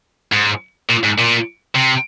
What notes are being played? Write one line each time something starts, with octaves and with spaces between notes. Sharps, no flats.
G#2
A#2
G#2
A#2
C3